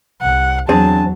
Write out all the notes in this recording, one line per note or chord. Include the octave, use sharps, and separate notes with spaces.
C2 F#5
E2 F#3 C4 D4 G#4 A5